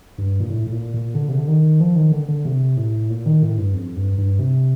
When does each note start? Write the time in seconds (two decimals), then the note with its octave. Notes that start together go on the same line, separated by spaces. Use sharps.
0.18 G2
0.40 A#2
0.50 A2
0.67 A2
0.72 A#2
0.94 A#2
1.15 D3
1.29 C3
1.37 D3
1.48 D#3
1.80 F3
1.96 D#3
2.12 D3
2.28 D3
2.45 C3
2.77 A2
3.10 A#2
3.26 D#3
3.43 A2
3.58 G2
3.74 F2
3.96 G2
4.18 G2
4.39 C3